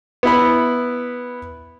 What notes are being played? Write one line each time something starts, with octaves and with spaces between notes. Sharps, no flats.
B3 E4 B5